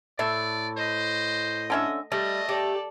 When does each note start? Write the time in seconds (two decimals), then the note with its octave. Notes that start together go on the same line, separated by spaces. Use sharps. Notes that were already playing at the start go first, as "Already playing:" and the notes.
0.19 A2 D5 E5
0.77 C5 D#5
1.70 D3 C#4 E5
2.12 G3 A3 D#5
2.49 G4 A4 D5